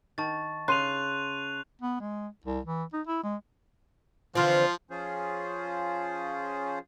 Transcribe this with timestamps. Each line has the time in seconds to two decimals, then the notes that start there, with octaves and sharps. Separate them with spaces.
0.18 D#3 A5 C#6 A6
0.68 C#3 C6 F#6 D#7 F7
1.82 B3
2.00 G#3
2.45 C2
2.65 E3
2.93 D#4
3.07 E4
3.24 G#3
4.35 D3 E3 F3 C4 F4
4.90 F3 C#4 F4 G#4 C5